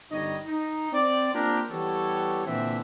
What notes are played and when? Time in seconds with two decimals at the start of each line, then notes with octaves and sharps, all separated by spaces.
0.11 G1 D#3 G3 D#4 C#5 D#5
0.47 D#4
0.93 C4 D5
1.34 A#3 C4 D4 F4 G4 A#4
1.71 E3 G3 B3 G4 A4 C#5
2.47 A#2 D3 E3 C4 D4 E5